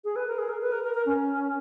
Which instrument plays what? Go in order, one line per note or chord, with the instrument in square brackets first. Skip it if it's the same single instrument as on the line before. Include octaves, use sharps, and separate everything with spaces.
[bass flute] G#4
B4
A#4
G#4
A#4
B4
A#4
A#4
A#4
C#4